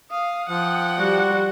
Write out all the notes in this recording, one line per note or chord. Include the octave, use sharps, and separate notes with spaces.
F5 D#6
F3 F#5 G5
G3 F#4